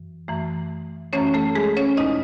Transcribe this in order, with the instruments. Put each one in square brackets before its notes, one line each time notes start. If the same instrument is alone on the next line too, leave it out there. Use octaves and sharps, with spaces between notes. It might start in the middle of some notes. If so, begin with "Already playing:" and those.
Already playing: [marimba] F#2 E3
F#2 E3 A3
F#2 E3 A3 C#4 C#5
A3 A4
G#3 G#4
C#4 C#5
E2 B2 G#3 D#4 D#5